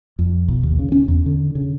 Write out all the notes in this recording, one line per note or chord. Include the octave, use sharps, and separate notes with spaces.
F2
B1
D#2
C#3
C#4
E2
D3
C#3